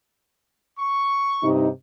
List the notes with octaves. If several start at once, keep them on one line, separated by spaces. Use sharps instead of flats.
C#6
G2 C3 D#4